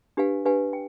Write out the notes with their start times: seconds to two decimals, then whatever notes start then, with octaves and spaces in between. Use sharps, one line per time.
0.17 D4 G4 B4 F5 G#5
0.45 D4 G4 B4 F5 G#5
0.73 G5